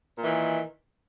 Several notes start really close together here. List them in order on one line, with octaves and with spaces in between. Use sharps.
A#2 E3 D#3